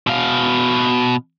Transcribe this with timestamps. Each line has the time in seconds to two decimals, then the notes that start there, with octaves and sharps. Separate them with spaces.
0.07 B2 F5